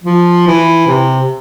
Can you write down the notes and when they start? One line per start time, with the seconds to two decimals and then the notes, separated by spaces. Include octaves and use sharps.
0.04 F3
0.47 E3
0.87 C3